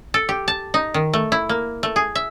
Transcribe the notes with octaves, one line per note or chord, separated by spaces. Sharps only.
A4
G4
A5
D#4
D#3
A3
E4
A#3
A3
G#4
E5